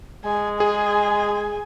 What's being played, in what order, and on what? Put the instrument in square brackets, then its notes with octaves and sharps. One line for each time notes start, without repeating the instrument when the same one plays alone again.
[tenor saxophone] G#3 [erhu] G#5
[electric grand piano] G#4 [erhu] G#5